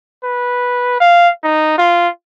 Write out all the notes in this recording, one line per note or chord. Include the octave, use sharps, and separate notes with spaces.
B4
F5
D#4
F4